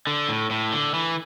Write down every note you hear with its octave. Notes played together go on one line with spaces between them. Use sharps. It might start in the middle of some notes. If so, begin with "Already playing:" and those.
D3
A2
A2
D3
E3